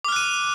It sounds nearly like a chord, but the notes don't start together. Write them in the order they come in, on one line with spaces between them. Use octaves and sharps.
D6 F6 F#6 D#7